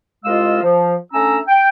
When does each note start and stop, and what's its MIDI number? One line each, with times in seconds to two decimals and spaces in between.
0.25 0.61 36
0.25 0.61 56
0.25 0.61 65
0.25 0.61 75
0.25 0.61 77
0.25 0.61 88
0.62 0.95 53
1.13 1.38 57
1.13 1.38 61
1.13 1.38 62
1.13 1.38 82
1.13 1.38 88
1.48 1.69 79